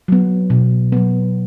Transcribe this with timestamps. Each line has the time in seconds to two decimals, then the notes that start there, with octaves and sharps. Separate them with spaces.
0.08 F#3 B3
0.50 B2
0.92 F#3 B3